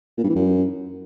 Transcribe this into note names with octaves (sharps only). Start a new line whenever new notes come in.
A#2
G2
E3
F#2